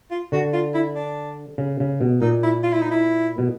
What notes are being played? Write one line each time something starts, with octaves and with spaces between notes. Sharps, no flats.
F4
D3 F#4
F4
E4
D4
C#3
C#3
B2
A#2 D#4
E4
F4
E4
D#4
E4
B2